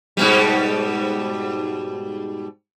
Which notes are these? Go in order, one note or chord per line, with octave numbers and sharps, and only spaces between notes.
G#2 B2 G3